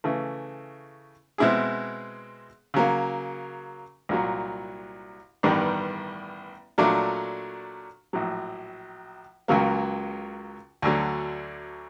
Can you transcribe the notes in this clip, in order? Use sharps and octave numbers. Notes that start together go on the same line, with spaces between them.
C#3 E3 A3
B2 G#3 C4 E4 G#4
C#3 F#3 A#3
C2 A#2 F#3
A1 G2 D#3 G3 B3
A#2 F#3 A3 D4
A#1 A2 F#3
C#2 C#3 F#3 A#3
D2 D3 F#3